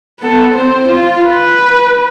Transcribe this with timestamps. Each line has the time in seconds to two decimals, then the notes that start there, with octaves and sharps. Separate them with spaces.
0.20 B3 A4
0.54 C4 C5
0.88 F4
1.24 B4